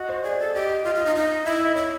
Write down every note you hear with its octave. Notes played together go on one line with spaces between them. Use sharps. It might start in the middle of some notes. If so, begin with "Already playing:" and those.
Already playing: F#4 D#5
C5
G#4 D5
A4
G4 D#5
D#5
F4 D#5
F4
D#4 D#5
D#4 D#5
E4 E5
D#5
E4 C#5